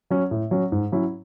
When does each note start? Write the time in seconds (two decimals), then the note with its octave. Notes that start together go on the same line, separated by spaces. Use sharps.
0.10 F#3 C#4
0.31 A2
0.51 F#3 C#4
0.72 G#2
0.92 F#3 C#4 E4